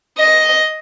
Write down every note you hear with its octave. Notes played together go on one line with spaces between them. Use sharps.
D#5